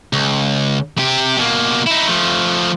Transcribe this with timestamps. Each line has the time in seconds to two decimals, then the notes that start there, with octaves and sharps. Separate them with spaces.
0.13 C#2
0.98 C3 G4
1.38 B2 A#3
1.87 D#4 E4
2.07 F3 A3